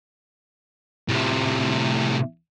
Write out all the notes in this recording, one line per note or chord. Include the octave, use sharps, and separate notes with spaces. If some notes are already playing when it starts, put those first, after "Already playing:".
A2 C3